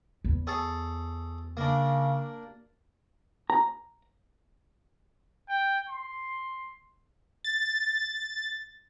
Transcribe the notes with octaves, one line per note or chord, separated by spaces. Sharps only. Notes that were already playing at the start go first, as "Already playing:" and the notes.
E2
G#4 A4 C#5
C#3 A#3 D4
A#5
G5
C6
A6